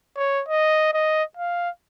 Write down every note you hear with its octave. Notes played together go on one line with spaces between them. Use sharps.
C#5
D#5
D#5
F5